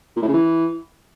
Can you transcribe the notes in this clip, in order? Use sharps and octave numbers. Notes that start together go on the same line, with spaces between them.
A#2
A2
C#3
E3